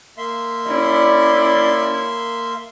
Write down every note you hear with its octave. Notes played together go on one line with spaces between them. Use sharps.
A#3 E5 C6
C#4 E4 D5